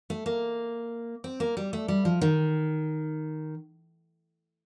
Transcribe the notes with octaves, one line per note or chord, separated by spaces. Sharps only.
A3
A#3
C4
A#3
G3
A3
G3
F3
D#3